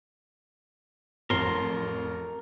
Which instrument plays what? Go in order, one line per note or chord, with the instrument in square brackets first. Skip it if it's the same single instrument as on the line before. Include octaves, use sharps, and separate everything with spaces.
[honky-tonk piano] A1 F2 [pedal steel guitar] A#4 C6